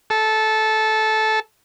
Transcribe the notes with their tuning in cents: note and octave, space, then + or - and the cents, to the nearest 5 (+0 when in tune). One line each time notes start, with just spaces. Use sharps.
A4 -15